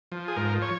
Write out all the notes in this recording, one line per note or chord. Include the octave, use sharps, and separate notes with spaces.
F3
G#4
G#2 A#4
C#5